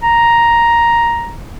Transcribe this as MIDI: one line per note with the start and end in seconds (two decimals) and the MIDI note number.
0.03 1.34 82